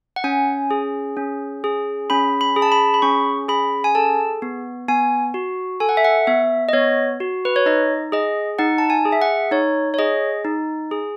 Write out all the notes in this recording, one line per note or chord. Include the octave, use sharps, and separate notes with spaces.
F#5
C#4 G#5
G#4
C#4
G#4
C#4 B5
B5
G#4
A5
B5
B5
C#4 C#6
G#4 B5
G#5
A4 A5
B3
B3 G#5
F#4
A4 G#5
F#5
E5
F#5
B3 E5
D#5
B3 C#5
F#4
B4
C#5
D#4 D#5
G#4 D#5
D#4 F#5
A5
G#5
G#4
E5
F#5
D#4 C#5
C#5
G#4 D#5
D#4
G#4